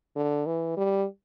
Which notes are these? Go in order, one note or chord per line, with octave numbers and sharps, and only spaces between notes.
D3
E3
G3